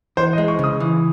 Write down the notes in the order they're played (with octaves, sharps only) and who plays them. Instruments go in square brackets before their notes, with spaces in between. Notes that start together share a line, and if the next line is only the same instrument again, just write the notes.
[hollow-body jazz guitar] E3 [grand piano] C5
[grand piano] D#5
[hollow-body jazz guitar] G#3
[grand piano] C#6
[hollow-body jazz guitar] C#3 [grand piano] D#6
[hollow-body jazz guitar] E3